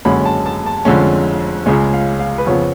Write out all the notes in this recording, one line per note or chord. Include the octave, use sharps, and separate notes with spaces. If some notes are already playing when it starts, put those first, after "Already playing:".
F#1 F#2 D3 G#3 C#4 B5
A5
A5
A5
F1 F2 D3 G#3 C#4
C#2 C#3 G#3 C#4 G#5
F5
F5
B4
F2 C#3 F3 B3 C#5